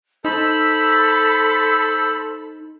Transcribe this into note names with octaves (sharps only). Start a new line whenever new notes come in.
D#4 A4 C5 B5 E6